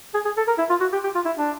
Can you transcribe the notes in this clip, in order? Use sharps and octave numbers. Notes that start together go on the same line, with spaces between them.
G#4
G#4
A4
A#4
E4
F4
F#4
G4
G4
F4
E4
D4